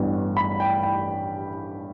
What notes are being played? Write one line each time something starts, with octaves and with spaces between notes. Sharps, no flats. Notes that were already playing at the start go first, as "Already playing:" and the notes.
Already playing: A1 G2 E3 B3
B5
G5
G5